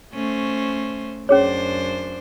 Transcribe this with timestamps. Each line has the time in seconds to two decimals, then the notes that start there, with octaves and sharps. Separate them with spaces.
0.13 A3 C#4 C5
1.29 F#2 C#4 D4 G#4 C5 C#5